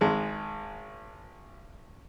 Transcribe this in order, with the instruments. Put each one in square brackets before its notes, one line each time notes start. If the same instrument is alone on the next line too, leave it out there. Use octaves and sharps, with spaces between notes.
[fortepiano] G#1 G#3